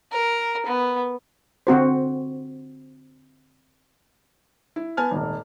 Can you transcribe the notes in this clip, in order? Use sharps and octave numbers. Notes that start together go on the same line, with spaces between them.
A#4
B3
D3 C4 F#4 C5
E4
B3 G#5 A5 F6
D#1 G#1